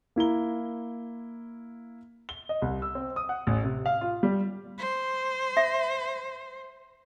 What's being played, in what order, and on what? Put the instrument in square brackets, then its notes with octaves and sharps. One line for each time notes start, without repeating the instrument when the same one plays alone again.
[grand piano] A#3 E4 A#5 G7
G7
D#5
C2
E6
C4
D#6
F#5
A1
C3
F5
F4
G3
[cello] C5
[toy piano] E5